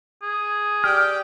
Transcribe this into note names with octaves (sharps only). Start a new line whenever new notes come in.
G#4
G4 D5 G5 F6